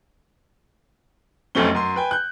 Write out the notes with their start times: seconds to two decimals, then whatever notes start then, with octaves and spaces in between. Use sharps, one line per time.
1.55 F1 B1 A3 C4 C#4 G7
1.75 F#2 C6
1.96 B4 G5 G#5
2.11 F#6 G6